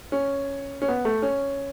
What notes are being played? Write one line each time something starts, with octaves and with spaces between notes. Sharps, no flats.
C#4
C#4
B3
A3
C#4